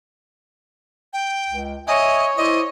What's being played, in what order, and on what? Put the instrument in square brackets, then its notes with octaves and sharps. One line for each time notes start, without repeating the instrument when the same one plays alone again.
[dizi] G5
[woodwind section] C#2
[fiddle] C#5 [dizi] D#5 [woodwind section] E5 G#5
[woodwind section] E4 C5 D5 [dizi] D#5